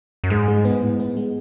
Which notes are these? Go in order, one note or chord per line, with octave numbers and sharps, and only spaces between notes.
F#2
G#2 G#3
G#3
B3
A2
B3
G#3